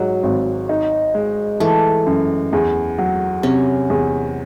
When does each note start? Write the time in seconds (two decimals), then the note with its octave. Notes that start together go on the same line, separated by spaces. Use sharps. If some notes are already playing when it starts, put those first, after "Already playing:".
Already playing: G#2 F#3
0.23 G#1
0.69 D#4
1.15 G#3
1.60 E3 A3
2.06 F#2
2.53 E2
2.98 F#3
3.43 C3 C#4
3.90 E2